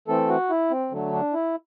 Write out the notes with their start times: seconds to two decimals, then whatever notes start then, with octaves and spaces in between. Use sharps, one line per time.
0.08 E3 A3 C4 A4
0.29 F#4
0.50 E4
0.71 C4
0.91 D3 F#3 A3
1.12 D4
1.34 E4